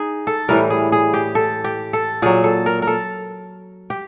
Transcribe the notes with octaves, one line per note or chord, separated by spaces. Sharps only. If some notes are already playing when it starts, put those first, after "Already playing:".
Already playing: D#4 G#4
A4
A2 E3 G3 A#4
G#4
G#4
G4
A4
G4
A4
A#2 F#3 G#4
A4
A#4
A#4
A4
G4